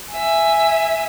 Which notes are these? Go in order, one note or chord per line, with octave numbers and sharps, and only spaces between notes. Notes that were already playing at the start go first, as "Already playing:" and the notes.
E5 G#5